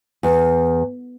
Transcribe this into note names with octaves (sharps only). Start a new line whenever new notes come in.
E2